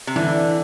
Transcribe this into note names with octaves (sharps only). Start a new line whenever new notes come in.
C3
D3 E3